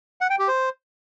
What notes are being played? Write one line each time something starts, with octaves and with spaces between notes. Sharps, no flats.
F#5
G5
G4
C5